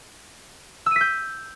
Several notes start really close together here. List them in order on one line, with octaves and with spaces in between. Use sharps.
E6 D#7 B6 G6